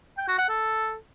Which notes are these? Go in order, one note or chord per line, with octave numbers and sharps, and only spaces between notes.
G5
F#4
F#5
A4